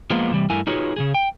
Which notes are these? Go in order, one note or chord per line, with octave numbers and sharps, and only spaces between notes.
F3 G#3 A#3 B3 F4
C3 E3 G3
G2 A3 E4 A#4 G#5
D#4 F4 F#4 G#4 B4 C#5
C#3 E3 G#4
G5